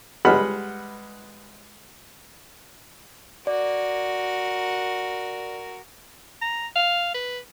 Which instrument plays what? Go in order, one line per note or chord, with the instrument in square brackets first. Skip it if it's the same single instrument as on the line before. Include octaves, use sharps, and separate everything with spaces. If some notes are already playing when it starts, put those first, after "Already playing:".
[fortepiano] G3 G#3 B4 F#5 B5 F6
[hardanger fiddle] F#4 A#4 [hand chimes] D5
[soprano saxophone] A#5
F5
B4